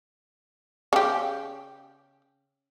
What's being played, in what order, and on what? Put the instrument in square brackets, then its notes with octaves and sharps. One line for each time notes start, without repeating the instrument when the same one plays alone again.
[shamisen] C#3 G4